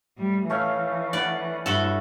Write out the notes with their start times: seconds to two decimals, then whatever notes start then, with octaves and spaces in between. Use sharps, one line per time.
0.18 A2 G3
0.50 E3 A3 C#4 F5
1.13 B4 D5 F#5
1.66 G2 E4 F#4 A4